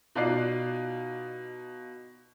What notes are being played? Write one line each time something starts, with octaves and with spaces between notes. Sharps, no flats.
B2 D#4 F4 D5 F#6 C7